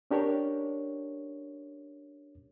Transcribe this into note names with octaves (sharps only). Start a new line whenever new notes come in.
C#4 D4 G4 A#4 C#5